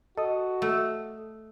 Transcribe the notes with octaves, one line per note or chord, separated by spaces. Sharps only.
F#4 A4 D#5 D#6
A3